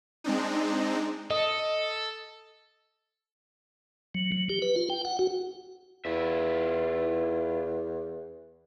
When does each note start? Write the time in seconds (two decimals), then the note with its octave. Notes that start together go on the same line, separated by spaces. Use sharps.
0.24 G#3 C4 D4 D#4
1.30 A4 D#5 D#6
4.14 F#3
4.32 F#3
4.49 G4
4.62 B4
4.76 F4
4.90 G5
5.05 F#5
5.19 F#4
6.05 E2 E4 F4 E5